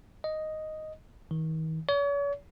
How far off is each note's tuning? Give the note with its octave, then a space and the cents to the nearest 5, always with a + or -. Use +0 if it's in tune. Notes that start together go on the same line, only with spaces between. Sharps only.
D#5 +0
D#3 +40
C#5 +40